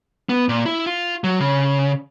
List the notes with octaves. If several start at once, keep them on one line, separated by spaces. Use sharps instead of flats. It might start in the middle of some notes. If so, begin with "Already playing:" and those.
B3
A#2
E4
F4
F#3
C#3